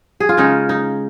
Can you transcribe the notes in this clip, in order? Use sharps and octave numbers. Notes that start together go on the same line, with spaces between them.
G#4
F4
C#3 G#3 C#4 D#4
D#4